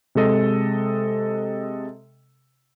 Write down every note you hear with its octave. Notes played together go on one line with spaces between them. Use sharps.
C3 G#3 A4 D#5